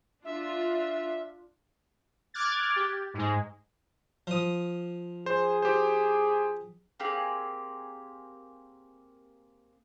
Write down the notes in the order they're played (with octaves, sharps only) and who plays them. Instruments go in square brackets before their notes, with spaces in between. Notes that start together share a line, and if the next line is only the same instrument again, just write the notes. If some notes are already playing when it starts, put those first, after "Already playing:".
[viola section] D4 F4 [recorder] E5
[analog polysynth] D6 F6 F#6 G#6 A6
G4
G#2 G#3
[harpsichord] F3 D#6
[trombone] G#4 [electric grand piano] C5
[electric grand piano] G4 C5
[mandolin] A#3 C4 G4 G#4